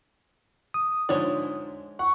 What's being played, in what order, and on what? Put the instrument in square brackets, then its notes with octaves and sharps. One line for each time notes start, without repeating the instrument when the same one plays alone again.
[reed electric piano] D#6
[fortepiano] G#2 D3 F3 [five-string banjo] G#3 C#5 D5
[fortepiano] F#5 [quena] C#6